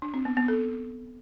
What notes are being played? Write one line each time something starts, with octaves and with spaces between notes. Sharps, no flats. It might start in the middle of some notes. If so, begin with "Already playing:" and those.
D4
C4
B3
B3
A4